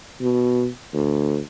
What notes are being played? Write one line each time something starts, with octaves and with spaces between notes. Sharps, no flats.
B2
D2